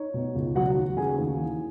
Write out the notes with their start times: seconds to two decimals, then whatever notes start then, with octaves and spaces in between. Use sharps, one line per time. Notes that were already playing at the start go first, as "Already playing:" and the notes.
Already playing: D#4 C#5
0.14 B2
0.35 C#2
0.55 F#3 F#4 F#5
0.76 D#2
0.97 C#3 G#4 G#5
1.18 D#2
1.39 E3